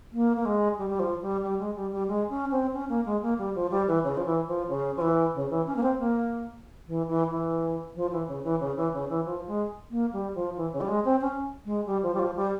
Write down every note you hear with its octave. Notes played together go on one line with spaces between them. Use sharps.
A#3
A#3
G#3
G3
G3
F3
G3
G3
G#3
G3
G3
G#3
C#4
C4
C#4
A#3
G#3
A#3
G3
F3
G3
E3
C#3
F3
E3
F3
C#3
F3
E3
C#3
E3
C#4
A#3
C4
A#3
E3
E3
E3
F3
E3
C#3
E3
C#3
E3
C#3
E3
F3
G#3
A#3
G3
F3
E3
C#3
G3
G#3
C4
C#4
G#3
G3
F3
G3
F3
G3